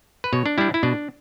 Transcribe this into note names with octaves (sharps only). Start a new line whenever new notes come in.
B4
B2 C#5
D4
G3 D4 E4
E4
B2 D4